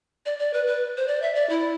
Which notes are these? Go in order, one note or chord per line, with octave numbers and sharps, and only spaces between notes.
D5
D5
B4
B4
C5
D5
E5
D5
E4